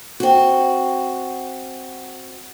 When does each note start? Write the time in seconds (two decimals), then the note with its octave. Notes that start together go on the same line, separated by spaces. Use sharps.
0.20 C4 F#4